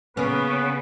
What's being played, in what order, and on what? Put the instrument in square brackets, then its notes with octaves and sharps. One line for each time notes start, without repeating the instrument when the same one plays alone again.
[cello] C#3 [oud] A#3 C#4 [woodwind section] B3 B4